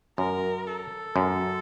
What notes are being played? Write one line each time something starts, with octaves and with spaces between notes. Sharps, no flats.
F#2 A#4
A4
F#2